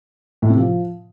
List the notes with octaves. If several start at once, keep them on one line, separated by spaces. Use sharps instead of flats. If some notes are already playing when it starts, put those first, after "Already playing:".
A2
C3
F3